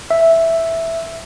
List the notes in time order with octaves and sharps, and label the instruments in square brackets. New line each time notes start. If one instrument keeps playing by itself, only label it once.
[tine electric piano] E5